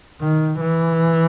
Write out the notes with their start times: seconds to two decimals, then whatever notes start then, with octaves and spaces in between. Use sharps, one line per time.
0.21 D#3
0.61 E3